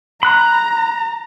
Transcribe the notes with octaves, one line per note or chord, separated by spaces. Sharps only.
A#5 B5 F#6